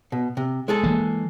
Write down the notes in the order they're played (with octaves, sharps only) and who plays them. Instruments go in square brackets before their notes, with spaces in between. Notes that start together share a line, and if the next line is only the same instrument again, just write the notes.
[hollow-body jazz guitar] B2
C3
G#3 G#4 A4
[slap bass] E3 A#3